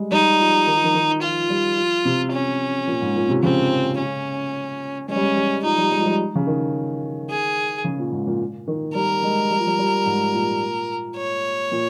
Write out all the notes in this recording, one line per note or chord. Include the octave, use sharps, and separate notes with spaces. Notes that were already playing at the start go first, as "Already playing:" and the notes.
Already playing: G3 G#3
G3 D#4
F3
D#3
F3
D#3
D#3
F3 F4
G3
F3
C3
C#4
A#2
G#2
A#2
C3
C#3 C4
C#4
G#3 C#4
G3
G#3
G3
F3 D#4
G3
G#3
F3
G3
C#3
D#3
G#4
C#3
A#2
G#2
A#2
D#3
G3 A#4
G#3
G3
F3
G3
G3
G#2
A#2
C#5
A#2